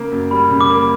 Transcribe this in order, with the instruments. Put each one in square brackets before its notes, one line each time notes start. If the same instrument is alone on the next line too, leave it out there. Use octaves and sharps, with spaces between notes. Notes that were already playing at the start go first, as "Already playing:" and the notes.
Already playing: [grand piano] C#3 A#3
F#2
[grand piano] G3 [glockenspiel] B5
[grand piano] C#3
[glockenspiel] D6
[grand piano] A#3